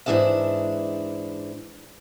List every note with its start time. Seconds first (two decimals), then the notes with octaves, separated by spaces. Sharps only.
0.06 G#2 E3 D4 E4 G#4 E5